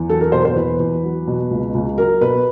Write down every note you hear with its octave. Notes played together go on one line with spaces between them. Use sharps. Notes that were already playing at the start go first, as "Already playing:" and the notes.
Already playing: E2
F#3 A4
A#4
B2 C5
C5
E2 B4
E2
F#3
B2
C#2
C#2
F#3 A#4
B2 B4